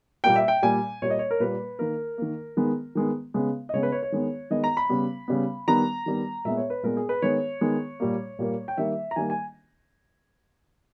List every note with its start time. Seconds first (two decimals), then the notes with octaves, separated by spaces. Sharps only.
0.24 A#2 G3 A#3 G5
0.36 E5
0.48 G5
0.62 A#2 G3 A#3 G#5
1.02 A#2 G3 A#3 C#5
1.10 D#5
1.19 C#5
1.31 A#4
1.40 A#2 G3 A#3 B4
1.79 D#3 A#3 A#4
2.18 D#3 A#3
2.57 D#3 G#3 B3
2.95 D#3 G#3 B3
3.34 C#3 G#3 B3
3.69 D#5
3.73 C#3 G#3 B3 C#5
3.83 B4
3.92 C#5
4.03 C#5
4.12 D#3 G#3 B3
4.50 D#3 G#3 B3 D#5
4.64 A#5
4.77 B5
4.89 C#3 G3 B3
5.28 C#3 G3 B3
5.68 D#3 G3 B3 A#5
6.06 D#3 G3 B3
6.45 A#2 G#3 B3 E5
6.57 C#5
6.70 B4
6.83 A#2 G#3 B3 A#4
6.97 G#4
7.09 B4
7.22 D#3 G#3 B3 C#5
7.61 D#3 G#3 B3
8.00 A#2 G3 A#3
8.39 A#2 G3 A#3
8.68 G5
8.77 D#3 G3 A#3 E5
9.11 A#5
9.16 D#3 G3 A#3 G#5
9.30 G#5